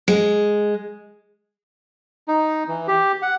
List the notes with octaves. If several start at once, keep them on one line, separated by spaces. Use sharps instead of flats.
G#3
D#4
E3
G4
F#5